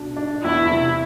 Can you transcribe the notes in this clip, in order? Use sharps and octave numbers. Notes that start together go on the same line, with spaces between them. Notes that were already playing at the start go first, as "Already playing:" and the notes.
Already playing: B2 D4
D4
E2 E4
C3